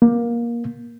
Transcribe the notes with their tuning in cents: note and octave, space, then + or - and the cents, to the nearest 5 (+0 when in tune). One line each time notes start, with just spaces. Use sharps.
A#3 +20